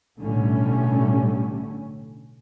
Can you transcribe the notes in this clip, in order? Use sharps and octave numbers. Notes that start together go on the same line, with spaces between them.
B1 A2 D3 G3 A3 C#4